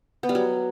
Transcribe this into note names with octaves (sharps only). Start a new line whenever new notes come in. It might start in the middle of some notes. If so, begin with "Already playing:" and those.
B3
G3
F#3